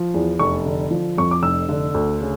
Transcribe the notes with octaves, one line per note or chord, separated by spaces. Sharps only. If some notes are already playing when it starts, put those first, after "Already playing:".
Already playing: F3
E2
F1 C#6
D3
F3
F2 C#6
D6
F1 E6
D3
D2
C#3